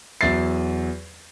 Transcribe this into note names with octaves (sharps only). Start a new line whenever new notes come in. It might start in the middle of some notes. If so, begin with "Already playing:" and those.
E2 F#3 E5 A6 C7